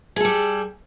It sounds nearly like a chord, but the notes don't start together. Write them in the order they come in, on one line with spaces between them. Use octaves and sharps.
G#4 A4 G3